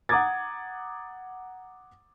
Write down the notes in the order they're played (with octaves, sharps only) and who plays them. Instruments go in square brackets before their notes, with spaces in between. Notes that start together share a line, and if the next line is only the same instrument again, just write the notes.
[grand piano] F#5 A#5 D6 D#6 G#6 A6